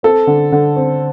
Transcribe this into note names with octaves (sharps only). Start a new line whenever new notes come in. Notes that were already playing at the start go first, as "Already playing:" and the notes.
C4 A4
D3
D3
C4